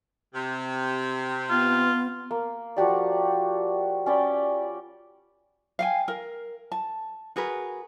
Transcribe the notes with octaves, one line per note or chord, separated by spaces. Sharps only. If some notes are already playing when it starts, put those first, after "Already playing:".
C3
B3 F4
A#3
F3 F#4 G4 D5
C#4 D5 G5 B5
F5 G5 G#5
A#4
A5
F#4 G#4 A#4 B4